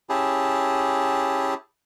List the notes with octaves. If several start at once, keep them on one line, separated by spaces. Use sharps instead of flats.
C#4 E4 G4 G#4 A5